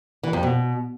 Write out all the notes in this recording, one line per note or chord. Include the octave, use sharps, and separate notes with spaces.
E3
F2
B2